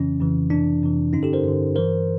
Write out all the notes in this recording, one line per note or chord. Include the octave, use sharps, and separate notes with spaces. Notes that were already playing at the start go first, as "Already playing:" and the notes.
Already playing: F2 C#3 E3 C#4
F2 C#3 E3
F2 C3 E3 D4
F2 C3 E3
G2 D3 C#4 D#4
G4 A4
A#4 C5
G2 D3
G2 E3 A#4 C5